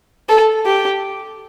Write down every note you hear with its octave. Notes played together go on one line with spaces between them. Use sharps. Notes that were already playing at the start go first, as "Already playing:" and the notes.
A4
G4